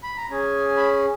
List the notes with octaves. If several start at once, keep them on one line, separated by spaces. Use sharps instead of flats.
B5
A#5
C#4 G#4 G#5
B5